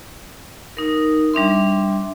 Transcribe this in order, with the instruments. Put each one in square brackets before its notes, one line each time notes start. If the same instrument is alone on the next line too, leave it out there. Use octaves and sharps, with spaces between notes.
[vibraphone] D#4 A#4
G3 D4 E5 C6